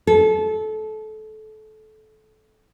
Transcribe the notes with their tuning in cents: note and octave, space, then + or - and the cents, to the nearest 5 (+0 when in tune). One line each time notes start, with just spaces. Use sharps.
A4 -25